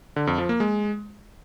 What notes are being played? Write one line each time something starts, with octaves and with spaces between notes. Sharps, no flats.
D3
F2
F3
A#3
G#3